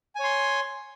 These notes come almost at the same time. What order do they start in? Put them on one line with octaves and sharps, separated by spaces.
G#5 C#5 C6